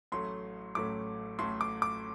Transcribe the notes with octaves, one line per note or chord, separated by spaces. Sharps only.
A1 A2 F#3 A3 C6
A1 A2 F#3 A3 D6
A1 A2 F#3 A3 C6
D6
D6